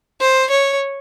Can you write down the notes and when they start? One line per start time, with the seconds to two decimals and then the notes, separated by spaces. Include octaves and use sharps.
0.21 C5
0.50 C#5